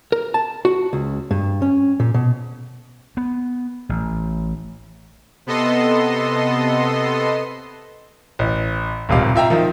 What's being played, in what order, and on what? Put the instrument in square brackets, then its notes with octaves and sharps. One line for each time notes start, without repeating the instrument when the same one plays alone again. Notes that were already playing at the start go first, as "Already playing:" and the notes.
[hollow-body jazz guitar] A#4
A5
F#4
C#2
G2
C#4
A#2
B2
[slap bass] B3
A1
[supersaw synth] C3 B3 A4 D#5 C6
[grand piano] A1
D#1 G#1 C3 F5
F4 E5 G5 A#5
D#3 F3